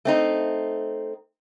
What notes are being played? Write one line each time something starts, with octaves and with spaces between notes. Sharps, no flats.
A3 C4 D#4